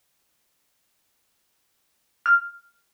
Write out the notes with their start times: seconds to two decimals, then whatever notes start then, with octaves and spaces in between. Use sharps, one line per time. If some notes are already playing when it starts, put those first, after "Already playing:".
2.26 F6